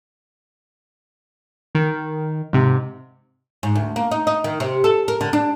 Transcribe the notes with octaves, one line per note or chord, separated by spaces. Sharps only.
D#3
G#2 C3
G#2
D2
A#3
D#4
D#4
D#3
C3
A4
A#4
D3
D4